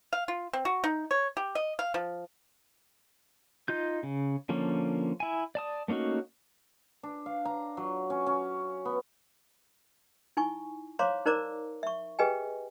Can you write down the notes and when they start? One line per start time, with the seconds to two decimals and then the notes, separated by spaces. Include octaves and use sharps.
0.13 F5
0.28 F4
0.53 C4
0.65 F#4
0.84 D#4
1.11 C#5
1.37 G4
1.55 D#5
1.79 F5
1.94 F3
3.68 D#4 F4 G6
4.03 C#3
4.49 D3 F3 A#3 C#4
5.20 E4 G#5
5.55 D5 A5 D#6
5.88 A3 A#3 C#4 D#4 F#4
7.03 D4
7.26 F5
7.45 A#5
7.77 F#3
8.10 C#4
8.27 C#4
8.85 B3
10.37 D#4 E4 G#5 C#6
10.99 C5 C#5 F5 A#5 C6 D6
11.26 D#4 A#4 C5 D5 A#5 D6
11.83 E5 C#6
12.19 G4 G#4 B4 D#5 G5 G#5